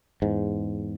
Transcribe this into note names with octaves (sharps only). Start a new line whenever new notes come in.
E2 G#2